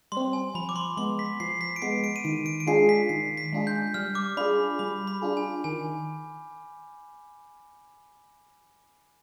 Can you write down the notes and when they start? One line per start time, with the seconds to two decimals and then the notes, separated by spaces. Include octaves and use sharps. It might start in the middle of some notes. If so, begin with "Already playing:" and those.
0.12 G3 C4 C6
0.33 G#5
0.55 F3 B5
0.69 D6
0.76 C6
0.97 G#3 B3 C6
1.19 B6
1.40 F3 C7
1.61 B6
1.76 D7
1.82 G#3 B3 C7
2.04 D7
2.16 D#7
2.24 D#3 D7
2.46 D7
2.60 D7
2.67 G#3 D4 F4 G#4 C7
2.89 B6
3.09 D#3 C7
3.37 B6
3.53 G#3 D4 F4 G#4
3.67 G6
3.94 G3 F6
4.15 D6
4.37 D4 F4 G#4 B5
4.79 G3 B5
5.07 B5
5.22 D4 F4 G#4
5.37 G#5
5.64 D#3 G#5